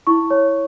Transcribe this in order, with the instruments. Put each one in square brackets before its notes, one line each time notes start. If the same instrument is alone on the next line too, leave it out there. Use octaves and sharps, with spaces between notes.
[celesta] E4 C#6
C#5